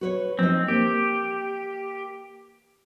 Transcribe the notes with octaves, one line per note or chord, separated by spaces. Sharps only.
F#4 B4 C#5
F3 C4 D#4
A#3 G4